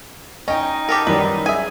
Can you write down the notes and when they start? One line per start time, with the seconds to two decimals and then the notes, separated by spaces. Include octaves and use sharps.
0.48 C#4 D#4 D#5 G5
0.89 G4 A4 A#4
1.07 F#2 D#3 G3 B4
1.46 G#4 E5 G#5